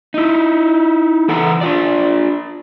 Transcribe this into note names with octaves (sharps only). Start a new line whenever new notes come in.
D#4 E4
E3 A4 F#5 A#5
D4 F4 D5